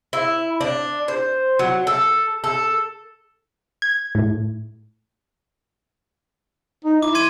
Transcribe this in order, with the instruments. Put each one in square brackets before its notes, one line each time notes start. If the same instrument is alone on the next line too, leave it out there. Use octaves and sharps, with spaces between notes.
[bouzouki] E4
D4
C5
F#3
A4
A4
[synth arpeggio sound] G#6
A2
[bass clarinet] D#4
[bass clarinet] E4 [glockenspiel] D6
[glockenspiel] C6 G#6 D#7